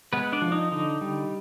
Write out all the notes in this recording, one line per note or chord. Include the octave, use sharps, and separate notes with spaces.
G#3 B3 B4
D4 D5
F3
D#4
D3 D#4
G3